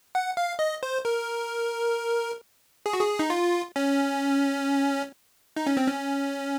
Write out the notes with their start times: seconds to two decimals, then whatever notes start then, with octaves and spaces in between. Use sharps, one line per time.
0.15 F#5
0.37 F5
0.59 D#5
0.83 C5
1.05 A#4
2.86 G#4
2.93 F#4
3.01 G#4
3.19 D#4
3.30 F4
3.76 C#4
5.57 D#4
5.67 C#4
5.77 C4
5.88 C#4